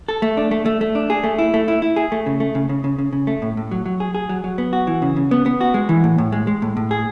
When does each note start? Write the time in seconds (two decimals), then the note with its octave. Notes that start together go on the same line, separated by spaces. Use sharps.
0.08 A4
0.22 A3
0.37 D4
0.51 A3
0.66 A3
0.81 A3
0.95 D4
1.10 G#4
1.24 A3
1.39 E4
1.54 A3
1.68 E4
1.82 E4
1.96 G#4
2.12 A3
2.26 C#3
2.40 A3
2.55 C#3
2.69 C#3
2.84 C#3
2.98 C#3
3.13 C#3
3.27 A3
3.42 A2
3.57 A2
3.71 F#3
3.86 F#3
4.00 G#4
4.15 G#4
4.29 F#3
4.44 F#3
4.58 B3
4.73 F#4
4.87 E3
5.02 C#3
5.16 C#3
5.31 B3
5.46 B3
5.61 F#4
5.74 G#3
5.89 E3
6.04 A2
6.18 A2
6.32 G#3
6.47 G#3
6.62 A2
6.77 A2
6.91 G#4